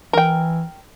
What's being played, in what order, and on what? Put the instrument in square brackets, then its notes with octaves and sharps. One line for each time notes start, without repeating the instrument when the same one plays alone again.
[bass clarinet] E3 [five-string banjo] A#4 G5